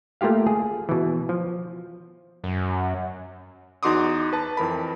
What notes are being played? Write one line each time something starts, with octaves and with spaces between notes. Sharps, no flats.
A3 A#3 F4 G4 F5
G#4
B2 E3
F3
F#2
E2 D#4 F#4 C6 D6 D#6
B4 A5
F2 E3 A#4 B5